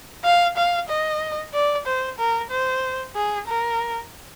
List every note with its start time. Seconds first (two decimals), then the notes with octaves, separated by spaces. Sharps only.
0.24 F5
0.56 F5
0.89 D#5
1.53 D5
1.86 C5
2.18 A#4
2.51 C5
3.15 G#4
3.48 A#4